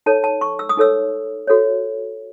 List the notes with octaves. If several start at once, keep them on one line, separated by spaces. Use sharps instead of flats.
D#4 A4 C#5 A5
A5
C#6
E6
D#6
D#4 A4 C#5 E6
F#4 A4 C#5